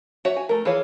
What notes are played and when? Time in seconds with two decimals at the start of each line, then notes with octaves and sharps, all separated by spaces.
0.25 F#4 C#5 E5
0.37 G#5
0.49 A3 A#4
0.65 E3 F4 G#4 C#5